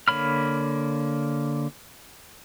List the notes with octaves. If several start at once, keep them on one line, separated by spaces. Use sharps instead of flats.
D3 A#3 C#5 B5 F6